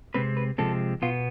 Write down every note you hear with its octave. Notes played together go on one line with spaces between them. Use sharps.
C3 G#3 C4 B4
B4
C3 F3 G#3 C4 A4
B2 B3 F4